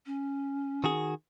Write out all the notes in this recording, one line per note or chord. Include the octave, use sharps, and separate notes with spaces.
C#4
D#3 F#4 G#4